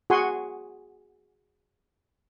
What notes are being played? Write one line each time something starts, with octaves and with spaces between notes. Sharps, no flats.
F#4 G#4 F#5 G#5 C6